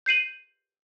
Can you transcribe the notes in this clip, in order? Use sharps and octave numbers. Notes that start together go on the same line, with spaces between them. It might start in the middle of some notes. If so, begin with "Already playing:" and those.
G6 C7 D#7 F#7